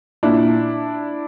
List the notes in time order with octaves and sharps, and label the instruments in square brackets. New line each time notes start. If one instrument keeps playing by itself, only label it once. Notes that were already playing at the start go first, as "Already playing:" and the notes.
[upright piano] A#2 D4 E4